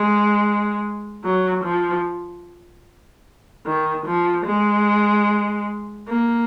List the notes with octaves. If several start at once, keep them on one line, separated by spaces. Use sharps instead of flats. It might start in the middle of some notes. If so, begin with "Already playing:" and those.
Already playing: G#3
F#3
F3
D#3
F3
G#3
A#3